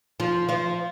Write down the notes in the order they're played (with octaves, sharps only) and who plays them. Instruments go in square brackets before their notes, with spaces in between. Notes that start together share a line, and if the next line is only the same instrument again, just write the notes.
[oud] F3 F4
F3 F4